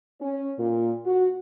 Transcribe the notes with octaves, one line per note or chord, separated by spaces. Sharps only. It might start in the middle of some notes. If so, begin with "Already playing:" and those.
C#4
A#2
F#4